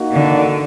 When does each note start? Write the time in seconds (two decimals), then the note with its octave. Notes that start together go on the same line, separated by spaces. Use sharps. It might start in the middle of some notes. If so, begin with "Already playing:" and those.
Already playing: A#3 D#4 F#4
0.12 D3